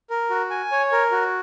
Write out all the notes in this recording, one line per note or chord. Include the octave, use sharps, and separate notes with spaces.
A#4
F#4
G#5
C#5
A#4
F#4